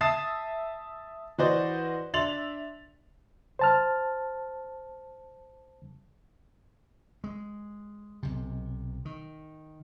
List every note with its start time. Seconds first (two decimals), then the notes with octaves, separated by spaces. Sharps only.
0.01 E5 A5 D#6 A6 C7 E7
1.38 E3 F#4 B4 C5 D5 D#5
2.14 D4 E5 C6 A6 F7 F#7
3.59 C5 A5 F6
7.24 G#3
8.23 B1 C3
9.05 D#3